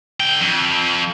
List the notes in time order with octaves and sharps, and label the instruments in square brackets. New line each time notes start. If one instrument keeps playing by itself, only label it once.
[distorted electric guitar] D3 G5
F2